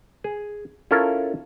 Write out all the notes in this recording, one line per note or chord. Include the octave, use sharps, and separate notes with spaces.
G#4
C#4 E4 F4 A4 A#4